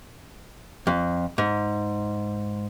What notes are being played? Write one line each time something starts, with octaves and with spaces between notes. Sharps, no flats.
F2
G#2